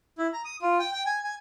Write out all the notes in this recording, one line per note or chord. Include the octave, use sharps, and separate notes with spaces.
E4
A#5
D#6
F4
G5
G5
G#5
G#5